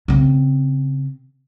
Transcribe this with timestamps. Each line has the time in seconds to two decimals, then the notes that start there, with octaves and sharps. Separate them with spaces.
0.08 C#3 C4